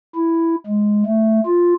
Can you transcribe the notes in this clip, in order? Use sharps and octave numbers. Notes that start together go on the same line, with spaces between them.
E4
G#3
A3
F4